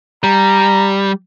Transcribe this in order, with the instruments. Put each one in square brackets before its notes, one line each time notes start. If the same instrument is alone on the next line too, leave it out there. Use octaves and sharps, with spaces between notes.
[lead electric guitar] G3 [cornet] A#5